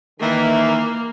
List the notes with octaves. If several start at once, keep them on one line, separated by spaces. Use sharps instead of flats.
D#3 E3 A#3